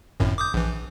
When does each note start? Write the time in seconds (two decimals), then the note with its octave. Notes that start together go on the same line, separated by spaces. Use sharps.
0.20 G#1 F#2 A2
0.38 D6 D#6 G6
0.54 A#1 E3